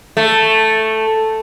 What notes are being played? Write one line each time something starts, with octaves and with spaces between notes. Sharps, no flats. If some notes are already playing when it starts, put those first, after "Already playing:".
A3